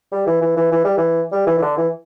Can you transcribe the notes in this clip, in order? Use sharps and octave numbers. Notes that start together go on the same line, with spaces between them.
G3
E3
E3
E3
E3
G3
E3
G3
E3
E3
D3
E3